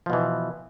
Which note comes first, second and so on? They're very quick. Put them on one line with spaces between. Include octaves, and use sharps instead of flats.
F3 B2 E3